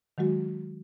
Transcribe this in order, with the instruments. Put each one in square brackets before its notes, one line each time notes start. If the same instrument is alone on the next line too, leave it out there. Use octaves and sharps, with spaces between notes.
[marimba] D#3 F#3 G#3 F#4